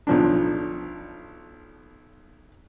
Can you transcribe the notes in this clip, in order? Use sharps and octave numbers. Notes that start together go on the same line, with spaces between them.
B1 F3 D4